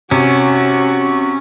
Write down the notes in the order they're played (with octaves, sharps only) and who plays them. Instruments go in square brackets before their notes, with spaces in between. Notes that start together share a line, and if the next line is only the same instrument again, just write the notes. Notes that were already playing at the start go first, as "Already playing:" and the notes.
[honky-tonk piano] C3 [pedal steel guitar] C#4 [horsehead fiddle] F#4